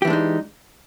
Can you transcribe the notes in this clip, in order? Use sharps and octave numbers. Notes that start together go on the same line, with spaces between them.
E3 G#3 D4 D#4 G4